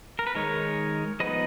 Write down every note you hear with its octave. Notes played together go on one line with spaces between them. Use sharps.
A#4
B4
D#3 G#3 D#4 A#4 C#5
F3 B3 D#4 B4 D#5